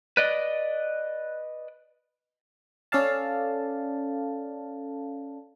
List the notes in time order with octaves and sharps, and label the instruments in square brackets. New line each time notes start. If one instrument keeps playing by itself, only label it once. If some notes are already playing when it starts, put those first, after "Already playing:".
[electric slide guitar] B4 D5 D#5
[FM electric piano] C#4 A4 D5 F5 A5